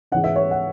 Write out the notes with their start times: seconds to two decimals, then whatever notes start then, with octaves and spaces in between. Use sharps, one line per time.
0.12 G#2 E3 C#4 F#5
0.24 E5
0.36 C#5
0.51 F#5